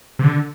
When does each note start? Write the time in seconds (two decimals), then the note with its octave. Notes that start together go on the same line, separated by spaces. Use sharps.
0.19 C3
0.24 D3